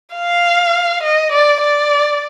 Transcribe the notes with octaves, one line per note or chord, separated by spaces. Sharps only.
F5
D#5
D5
D5